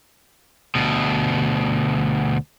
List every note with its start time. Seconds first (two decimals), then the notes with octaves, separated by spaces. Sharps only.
0.75 D2 B2